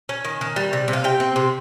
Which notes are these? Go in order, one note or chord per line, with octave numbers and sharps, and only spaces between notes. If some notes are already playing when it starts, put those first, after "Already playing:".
C#4
D#3
D#3
G3
C3
C3
F5
C3 G5
C4
C3